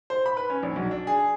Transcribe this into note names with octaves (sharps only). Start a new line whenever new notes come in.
C5
B5
B4
C#4
A#1
B1
D4
G#4